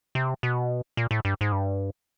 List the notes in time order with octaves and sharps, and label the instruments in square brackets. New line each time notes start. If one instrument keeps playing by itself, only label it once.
[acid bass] C3
B2
A#2
A2
G2
G#2
G2